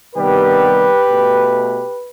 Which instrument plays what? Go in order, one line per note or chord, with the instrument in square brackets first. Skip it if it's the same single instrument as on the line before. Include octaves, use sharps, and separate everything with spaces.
[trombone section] C3 D#3 G3 B3 G4 B4
B2 A3